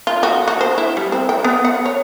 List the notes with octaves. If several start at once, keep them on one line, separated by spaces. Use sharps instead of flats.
F4
F#4
F#4
C5
E4
G3
C4
G5
B3
F#5
C#5